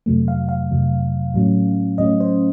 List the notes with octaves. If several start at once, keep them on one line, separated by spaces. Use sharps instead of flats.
F2 C3 F#3 A3
F5
F5
F2 C3 F#3 A3
A2 F#3 A3 C#4
A2 F#3 A3 C#4 D#5
C5